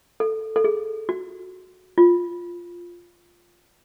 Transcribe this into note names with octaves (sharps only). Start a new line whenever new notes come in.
A4
A4
G#4
F#4
F4